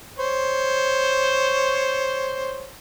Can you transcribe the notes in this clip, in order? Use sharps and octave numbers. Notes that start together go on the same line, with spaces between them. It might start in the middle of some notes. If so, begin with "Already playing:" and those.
C5 C#5